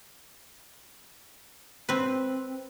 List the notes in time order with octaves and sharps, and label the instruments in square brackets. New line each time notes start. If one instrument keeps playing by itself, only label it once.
[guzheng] C4 B4